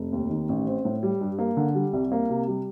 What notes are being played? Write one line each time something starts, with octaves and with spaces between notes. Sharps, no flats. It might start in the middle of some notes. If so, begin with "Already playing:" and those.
Already playing: F1
D#2
D#3
A1
C4
A2
G3
G2
A#3
D3
G3
C2
A#3
C3
G3